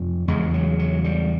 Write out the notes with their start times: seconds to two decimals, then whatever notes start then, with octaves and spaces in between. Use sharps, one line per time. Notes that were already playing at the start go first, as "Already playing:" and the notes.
Already playing: F2 C3
0.28 E2 C#3 G#3
0.54 F#3
0.79 F#3
1.04 G3